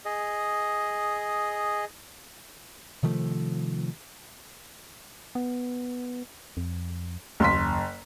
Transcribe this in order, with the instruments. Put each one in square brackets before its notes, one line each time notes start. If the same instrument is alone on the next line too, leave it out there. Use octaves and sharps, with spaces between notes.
[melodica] G#4 D#5
[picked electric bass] C3 D#3 F3 A3
[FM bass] B3
F2
[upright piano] F#1 C6 B6 [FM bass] D#2